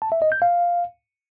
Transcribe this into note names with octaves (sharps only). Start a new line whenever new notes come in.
A5
E5
D#5
G6
F5